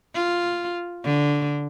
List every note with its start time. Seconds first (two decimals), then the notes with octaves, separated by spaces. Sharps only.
0.14 F4
1.04 D3